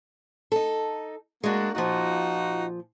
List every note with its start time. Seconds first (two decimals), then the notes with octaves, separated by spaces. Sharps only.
0.52 D#4 A4
1.44 G#3 A#3 D4 F#4
1.75 A#2 F3 D#4 F4 F#4